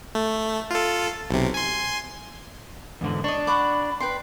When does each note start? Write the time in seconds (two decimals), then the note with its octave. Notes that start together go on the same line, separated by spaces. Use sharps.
0.15 A3
0.71 F4 A4
1.31 B1 C3
1.54 G#5 C6
3.01 E2 G#2 D3
3.24 D4 C#5 D#5
3.47 D5 F#5 B5 C#6
4.00 B4 G5 C6